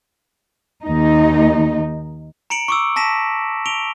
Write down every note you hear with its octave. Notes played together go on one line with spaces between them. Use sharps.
D#2 D#4
A#5 C#7 D7 F#7
C#6 D6 E6
A5 A#6 B6 E7
D7 F7 G7